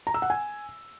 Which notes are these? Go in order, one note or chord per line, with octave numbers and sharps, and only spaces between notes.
A#5
E6
F#5
G#5